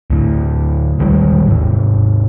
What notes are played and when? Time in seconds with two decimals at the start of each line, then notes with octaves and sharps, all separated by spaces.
0.10 D2 A2
0.99 D#1 D#3 G3 G#3
1.48 G#2 C3